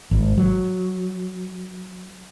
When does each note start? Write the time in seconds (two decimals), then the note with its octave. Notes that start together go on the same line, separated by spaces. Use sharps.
0.11 G#1
0.37 F#3